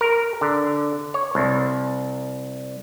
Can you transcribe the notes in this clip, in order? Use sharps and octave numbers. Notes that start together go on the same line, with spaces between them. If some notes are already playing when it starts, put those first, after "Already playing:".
A#4
D3
C#5
C2